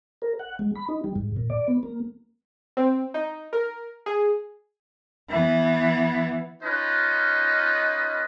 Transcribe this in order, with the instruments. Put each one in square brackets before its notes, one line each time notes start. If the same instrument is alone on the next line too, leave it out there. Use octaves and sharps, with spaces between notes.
[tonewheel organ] A#4
F#5
G#3
B5
D#4
G3
G#2
A#2
D5
B3
A#3
[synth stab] C4
D#4
A#4
G#4
[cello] E3 B3
[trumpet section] C#4 D#4 F4 B4 D#5